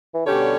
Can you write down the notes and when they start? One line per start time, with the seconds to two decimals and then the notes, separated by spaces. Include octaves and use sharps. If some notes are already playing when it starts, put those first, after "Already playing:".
0.14 E3
0.26 B2 D3 G3 C#4 G4 C#5